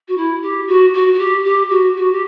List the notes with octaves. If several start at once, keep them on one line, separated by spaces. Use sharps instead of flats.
F#4
E4
G4
F#4
F#4
F#4
G4
G4
F#4
F#4
G4